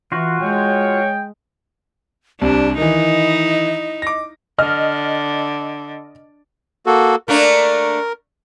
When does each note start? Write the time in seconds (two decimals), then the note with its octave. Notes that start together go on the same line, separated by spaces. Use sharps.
0.12 E3 F4 F#4
0.41 G#3 C#5 G5
2.41 C2 C3 D4 G4
2.78 D#3 E3 D#4 E4 D#5
4.02 D6 A#6
4.58 D3 D#5 F6
6.86 A#3 F#4 A4
7.28 A3 A#3 D4 A#4